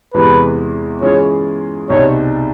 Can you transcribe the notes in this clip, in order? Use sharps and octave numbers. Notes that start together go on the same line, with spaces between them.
E2 C3 E3 G#3 B4
E3 G#3 C#4 F4 G#4 C#5
C2 B2 G3 C4 D#4 C#5